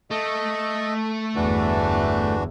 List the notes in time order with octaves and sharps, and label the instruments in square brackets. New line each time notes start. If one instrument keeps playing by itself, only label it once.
[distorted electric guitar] A3 [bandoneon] A4 D#5
[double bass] G1 E2 [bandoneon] E3 D4 F#4